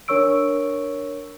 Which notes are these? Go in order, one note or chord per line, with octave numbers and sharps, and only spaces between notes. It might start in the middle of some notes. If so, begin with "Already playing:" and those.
D4 A#4 C#5 C#6 E6 D7